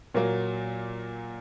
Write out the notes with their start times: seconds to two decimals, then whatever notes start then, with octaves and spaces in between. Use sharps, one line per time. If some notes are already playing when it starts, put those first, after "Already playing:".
0.14 A#2 F#3 A#3